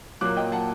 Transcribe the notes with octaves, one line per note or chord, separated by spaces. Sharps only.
A#2 F#3 A#3 D6 F#6
D#5 G5
F#5 A5